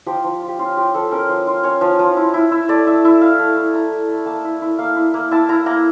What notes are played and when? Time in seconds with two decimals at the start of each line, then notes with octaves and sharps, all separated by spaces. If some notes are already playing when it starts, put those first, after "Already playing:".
0.06 F3 G4
0.24 F3
0.42 F4
0.48 G4
0.59 C#4 F4
0.77 F4 G4
0.94 F3 A4
1.11 C#4 A#4
1.29 F3
1.47 F4
1.64 C#4 C#5
1.81 F3
1.99 F3
2.17 E4
2.34 E4
2.51 E4
2.69 A3 D5
2.86 E4 E5
3.05 E4 E5
3.21 E4 F5
3.39 A3
3.57 E4
3.74 E4 A#5
3.92 A3
4.09 A3
4.26 A#3 A5
4.45 E4
4.62 E4
4.78 A#3 F5
4.96 E4
5.14 A#3
5.31 E4 A5
5.49 E4 A#5
5.66 A#3 A#5